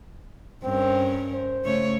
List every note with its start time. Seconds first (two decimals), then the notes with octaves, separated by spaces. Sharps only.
0.64 G2 C4 C#4 A#4
1.33 C5
1.64 C#3 A3 C#5